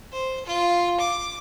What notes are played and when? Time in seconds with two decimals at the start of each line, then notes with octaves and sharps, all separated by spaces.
0.12 C5
0.46 F4
1.00 D6